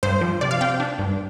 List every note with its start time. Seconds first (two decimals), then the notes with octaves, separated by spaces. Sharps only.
0.03 G2 C5
0.21 F3
0.41 C3 D5
0.51 F5
0.61 C3 G5
0.80 D4
0.99 G2